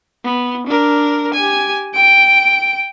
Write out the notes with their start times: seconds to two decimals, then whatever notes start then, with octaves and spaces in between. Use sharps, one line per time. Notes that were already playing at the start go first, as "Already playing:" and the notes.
0.24 B3
0.67 D4 A#4
1.34 G4 G#5
1.94 G5 D7